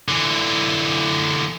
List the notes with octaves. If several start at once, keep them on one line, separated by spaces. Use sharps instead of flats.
D3 E3